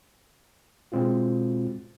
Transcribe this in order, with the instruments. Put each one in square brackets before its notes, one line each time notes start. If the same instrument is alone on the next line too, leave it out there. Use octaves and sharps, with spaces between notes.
[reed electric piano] B2 G#3 C4 F4 F#4